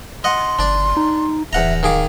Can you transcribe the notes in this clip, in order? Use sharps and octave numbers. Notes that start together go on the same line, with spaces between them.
D#5 F#5 C6
G1 D4 D5
D#4
D1 E2 E5 F#5 A#5
D#3 G#4 F5 D6